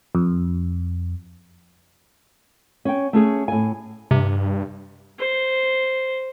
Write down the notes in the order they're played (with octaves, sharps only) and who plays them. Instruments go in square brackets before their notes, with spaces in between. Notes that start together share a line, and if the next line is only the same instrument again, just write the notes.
[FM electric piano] F2
[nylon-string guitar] C#4 G5
A3 C#4 G#4
A2 G#5
[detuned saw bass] G2 [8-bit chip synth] C3
[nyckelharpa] C5